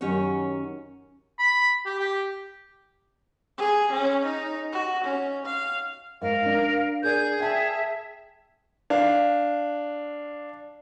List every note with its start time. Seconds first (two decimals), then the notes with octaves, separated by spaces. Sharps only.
0.01 F#2 D#3 C#4 F#4 G4 C#5
1.39 B5
1.86 G4
1.99 G4
3.58 G#4
3.92 C#4
4.24 D#4
4.72 F#4
5.04 C#4
5.45 F5
6.22 G#2 A#4 F5
6.46 D4
7.03 G#4 A#4 D5 G6
7.40 E5 G5 A5
8.90 D4 F5